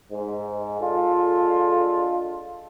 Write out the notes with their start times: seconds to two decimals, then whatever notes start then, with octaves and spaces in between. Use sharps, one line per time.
0.12 G#2
0.79 G#3 D4 F4 A4